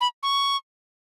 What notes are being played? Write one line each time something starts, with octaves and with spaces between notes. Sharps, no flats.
B5
C#6